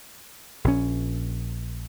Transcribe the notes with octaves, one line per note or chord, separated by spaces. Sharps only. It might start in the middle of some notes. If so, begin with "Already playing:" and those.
A#1 C#4